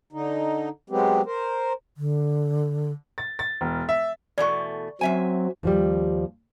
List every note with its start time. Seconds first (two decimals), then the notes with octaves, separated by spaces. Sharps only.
0.13 D3 D#4
0.90 F#3 G#3 B3 C4 G4
1.26 A#4 C5
1.97 D3
3.18 A6
3.39 A6
3.61 E1
3.89 E5
4.38 E2 B2 A3 D5 C#6
5.01 F#2 F#3 C4 E5 G#5
5.63 D#2 F3 G3